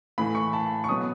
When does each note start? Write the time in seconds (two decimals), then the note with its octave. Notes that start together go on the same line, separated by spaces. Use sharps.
0.18 A2 E3 A3 B5
0.35 C#6
0.53 A5
0.84 C#6
0.89 B2 F#3 B3 D#6